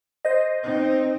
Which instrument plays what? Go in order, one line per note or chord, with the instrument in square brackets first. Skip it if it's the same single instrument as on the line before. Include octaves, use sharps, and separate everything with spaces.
[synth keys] C5 D#5
[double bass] C4 D#4